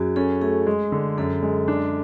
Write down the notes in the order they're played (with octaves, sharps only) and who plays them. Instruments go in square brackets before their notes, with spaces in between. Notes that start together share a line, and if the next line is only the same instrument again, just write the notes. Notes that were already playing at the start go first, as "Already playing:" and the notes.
Already playing: [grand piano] F#2 [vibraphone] F#4 G#4
[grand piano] C#4 [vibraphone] A4
[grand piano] A3 [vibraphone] G#4
[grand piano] G#3
D3
[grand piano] F#2 [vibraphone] A4
[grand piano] G#3
D4